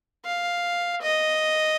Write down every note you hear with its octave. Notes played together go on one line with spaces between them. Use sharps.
F5
D#5